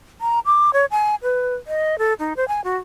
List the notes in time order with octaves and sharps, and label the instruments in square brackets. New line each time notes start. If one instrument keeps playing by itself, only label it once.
[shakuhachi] A#5
D6
C#5
G#5
B4
D#5
A4
D#4
C5
G#5
F#4